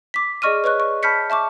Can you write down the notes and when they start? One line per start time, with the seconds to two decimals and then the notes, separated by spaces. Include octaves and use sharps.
0.14 D6 B6
0.42 G#4 D5 D#5 C#6 F6 D#7
0.64 B4 C#5 D#5 C#6 F#6
0.80 C#6
1.03 A5 B5 F6 G6 B6 C#7
1.30 E5 A5 C#6 D6